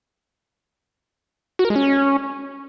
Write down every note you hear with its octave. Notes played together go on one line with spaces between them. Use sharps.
F#4
A#4
G#3
C#4